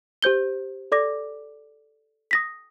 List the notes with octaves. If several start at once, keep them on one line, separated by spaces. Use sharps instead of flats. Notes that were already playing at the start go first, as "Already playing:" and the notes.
G4 C5 G6 G7
A4 D5 D6 A#6
D#6 A#6 B6